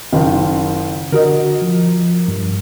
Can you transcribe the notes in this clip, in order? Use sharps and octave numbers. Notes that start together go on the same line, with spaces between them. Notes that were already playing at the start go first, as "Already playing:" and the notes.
F#1 D#3 F4
D3 F#4 A#4 D#5
F3
G2